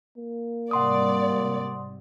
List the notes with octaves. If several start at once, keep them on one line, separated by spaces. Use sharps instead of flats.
A#3
G#2 C3 G3 D5 F#5 C6 D#6